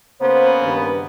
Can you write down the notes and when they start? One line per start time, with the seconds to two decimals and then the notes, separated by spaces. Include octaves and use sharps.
0.21 C#3 A#3 B3 C5
0.64 G2 D#3 B4